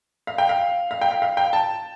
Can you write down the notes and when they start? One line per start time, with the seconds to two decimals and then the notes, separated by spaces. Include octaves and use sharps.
0.27 F5
0.38 G5
0.49 F5
0.91 F5
1.01 G5
1.11 F5
1.22 F5
1.37 G5
1.53 A5